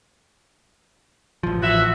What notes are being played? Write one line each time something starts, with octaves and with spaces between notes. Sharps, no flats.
A1 F3
F#4 E5